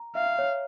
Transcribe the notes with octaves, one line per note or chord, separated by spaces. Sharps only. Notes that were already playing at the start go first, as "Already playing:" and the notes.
Already playing: A#5
E5 F5
C#5